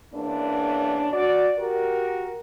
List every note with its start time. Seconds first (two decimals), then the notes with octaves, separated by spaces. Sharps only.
0.13 E2 A#3 C#4 D4
1.12 F#4 D5
1.58 F#4 G4 A#4